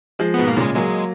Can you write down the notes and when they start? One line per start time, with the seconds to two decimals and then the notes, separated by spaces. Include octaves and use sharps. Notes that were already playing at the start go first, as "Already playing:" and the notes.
0.19 F3 G#3
0.34 G#2 B2 B3
0.47 A#3
0.57 A#2 C#3 G#3
0.75 F#3 G#3 A#3